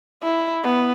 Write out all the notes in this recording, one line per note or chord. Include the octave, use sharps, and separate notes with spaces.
E4
B3